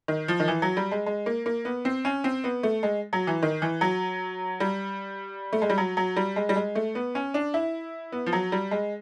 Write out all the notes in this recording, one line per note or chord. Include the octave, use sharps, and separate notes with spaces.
D#3
F3
D#3
E3
F#3
G3
G#3
G#3
A#3
A#3
B3
C4
C#4
C4
B3
A3
G#3
F#3
E3
D#3
E3
F#3
G3
A3
G#3
G3
F#3
F#3
G3
G#3
G3
G#3
A3
B3
C#4
D4
E4
B3
F3
F#3
G3
G#3